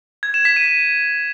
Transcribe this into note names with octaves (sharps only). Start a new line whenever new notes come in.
G#6
E7
B6
D#7